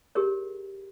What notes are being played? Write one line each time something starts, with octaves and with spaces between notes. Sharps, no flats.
G4 G#4 A#4 C#5